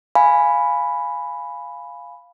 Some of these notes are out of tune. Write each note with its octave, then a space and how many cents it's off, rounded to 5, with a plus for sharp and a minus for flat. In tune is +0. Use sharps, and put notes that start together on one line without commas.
F5 +0 G#5 +0 B5 +0